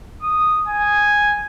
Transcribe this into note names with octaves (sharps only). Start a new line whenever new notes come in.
D#6
G#5